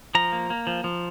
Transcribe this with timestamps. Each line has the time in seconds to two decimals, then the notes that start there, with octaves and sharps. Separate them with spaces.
0.15 F3 A#5
0.32 A#3
0.50 A#3
0.67 F3
0.84 F3